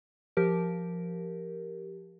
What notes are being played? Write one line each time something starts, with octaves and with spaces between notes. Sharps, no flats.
F3 G4 A#4